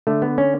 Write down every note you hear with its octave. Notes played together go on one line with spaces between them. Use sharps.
D3 A3
B3
C#4